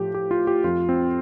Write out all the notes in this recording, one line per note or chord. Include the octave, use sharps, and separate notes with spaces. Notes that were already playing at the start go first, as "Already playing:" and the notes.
Already playing: A2 F3 G4
G4
F4
G4
F2 F3 F4
C4